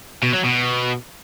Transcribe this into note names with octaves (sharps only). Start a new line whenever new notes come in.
B2
F#3
B2